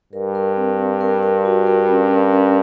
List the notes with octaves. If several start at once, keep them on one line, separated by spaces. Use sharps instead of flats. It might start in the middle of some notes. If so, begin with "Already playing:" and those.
G2 A#4
A#4
C4
A#4
A#4
A#4
F#4
A#4
C#4
A#4
C#4